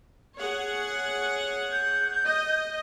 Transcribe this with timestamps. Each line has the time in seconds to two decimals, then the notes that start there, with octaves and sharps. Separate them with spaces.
0.38 G#4 C#5 F#5
1.72 G6
2.26 D#5